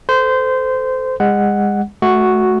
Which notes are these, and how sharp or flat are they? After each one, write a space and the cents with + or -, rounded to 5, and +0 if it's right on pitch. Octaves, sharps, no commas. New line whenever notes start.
A4 +0 C5 -20
G#3 -35 F#5 +0
A3 -25 F#4 +0